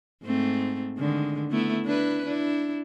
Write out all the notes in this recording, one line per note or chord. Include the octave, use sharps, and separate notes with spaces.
G#2 A3 C4
D3 D#3 G#3
A3 B3 E4
D4 E4 B4
D4 E4